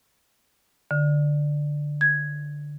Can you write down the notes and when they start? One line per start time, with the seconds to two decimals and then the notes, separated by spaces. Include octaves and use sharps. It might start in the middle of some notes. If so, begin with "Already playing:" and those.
0.91 D3
2.01 G#6